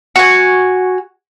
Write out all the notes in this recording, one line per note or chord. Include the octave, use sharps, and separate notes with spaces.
F#4 G#5